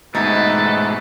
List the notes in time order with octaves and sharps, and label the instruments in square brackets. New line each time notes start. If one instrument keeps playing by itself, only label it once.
[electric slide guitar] G#2 B2 [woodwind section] G#3 A3 B4 [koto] D#4 G#5 [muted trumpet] A4